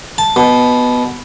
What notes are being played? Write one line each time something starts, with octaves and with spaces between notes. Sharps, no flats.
A5
B2